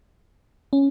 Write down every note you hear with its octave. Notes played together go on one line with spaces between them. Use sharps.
C#4